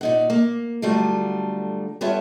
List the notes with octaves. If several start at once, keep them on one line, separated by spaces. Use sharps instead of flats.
A#2 D#4 F#5
A#3
D3 F#3 G3 A3 F4
G3 B3 F4 A4 C#5 E5